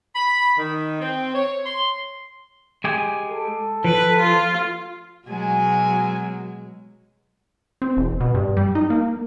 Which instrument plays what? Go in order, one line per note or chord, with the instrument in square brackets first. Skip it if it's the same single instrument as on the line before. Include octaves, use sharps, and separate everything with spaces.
[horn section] B5
D#3
C4
C#5
C6
[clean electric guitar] G#3 G4 G#5
[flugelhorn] A4
[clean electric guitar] F3 [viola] B4
[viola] F4
[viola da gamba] B2 F#3 G#3 [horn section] G#5
[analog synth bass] C4
E1
B2
G2
G3
D#4
A#3